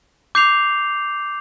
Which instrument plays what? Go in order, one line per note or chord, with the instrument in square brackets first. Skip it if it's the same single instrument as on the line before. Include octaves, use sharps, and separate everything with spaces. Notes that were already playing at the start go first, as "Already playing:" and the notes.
[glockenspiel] D6 G6 C7 F7